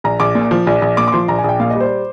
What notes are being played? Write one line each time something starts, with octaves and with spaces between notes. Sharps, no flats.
A#1 A#5
A#1 D6
A#2
F3
A#1
A#1
A#2 D6
D6
F3 C6
A#1 A#5
G#5
A#1
G5
A#2 F5
D#5
G3
C5